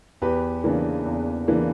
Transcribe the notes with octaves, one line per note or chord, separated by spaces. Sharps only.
E2 G4 B4
C#3 E3 A#3 D4
E2
C#3 E3 A#3 D4